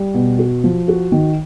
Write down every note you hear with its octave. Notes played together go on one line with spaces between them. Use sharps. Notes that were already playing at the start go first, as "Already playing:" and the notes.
Already playing: G3
B2
F#4
F3
F#4
D#3